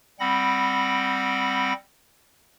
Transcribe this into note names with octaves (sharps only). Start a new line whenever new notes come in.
G3 C4 F#5 B5 A#6